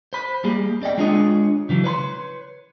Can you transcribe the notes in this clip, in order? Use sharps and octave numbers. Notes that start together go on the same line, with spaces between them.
C5 B5
G3 A#3 G4 G#4
C4 D5 D#5 G5
G#3 D4 F4 G#4 C#5 D#5
C#3 E3 F#3
B4 C#5 B5 C6